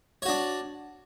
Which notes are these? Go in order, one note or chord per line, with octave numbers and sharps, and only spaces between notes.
D4 F#4 C#5